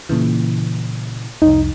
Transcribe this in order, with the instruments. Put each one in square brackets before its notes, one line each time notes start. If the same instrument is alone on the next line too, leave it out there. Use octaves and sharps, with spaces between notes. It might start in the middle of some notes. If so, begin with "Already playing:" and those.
[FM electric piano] A#2 C#3 E3
[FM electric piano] C2 F2 [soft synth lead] D#4